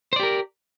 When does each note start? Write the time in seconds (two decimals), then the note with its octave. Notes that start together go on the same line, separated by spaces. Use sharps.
0.13 C5
0.16 D5
0.20 G4
0.23 A#4